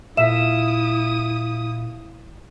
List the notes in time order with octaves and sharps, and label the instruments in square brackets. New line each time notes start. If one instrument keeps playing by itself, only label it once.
[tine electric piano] A#2 F5 [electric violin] E4 D#6 [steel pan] E5 [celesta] E7